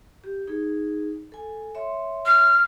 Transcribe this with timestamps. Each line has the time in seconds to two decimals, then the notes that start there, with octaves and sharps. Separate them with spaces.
0.24 G4
0.48 D#4 G#4
1.32 A4 G#5
1.75 C#5 E5 C6
2.26 F6